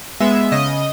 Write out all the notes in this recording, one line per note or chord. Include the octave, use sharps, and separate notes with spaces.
G#3 B3 E5
C#3 D#5